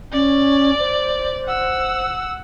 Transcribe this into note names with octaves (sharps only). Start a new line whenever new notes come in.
C#4 D5
C5
F#5 E6